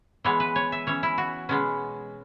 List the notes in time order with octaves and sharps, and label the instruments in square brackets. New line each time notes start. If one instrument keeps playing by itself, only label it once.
[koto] E3 G#3 B3 C#5
B4
C#5
E5
E3 C#4 C#5
E4
F#4
B2 G#3 B3 C#4